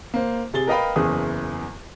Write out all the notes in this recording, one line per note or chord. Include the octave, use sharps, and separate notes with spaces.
A#3 C5
C3 G#4 A6 G7
A#4 B4 D#5 F5 G5 B5
F#1 E2 G#4 D#6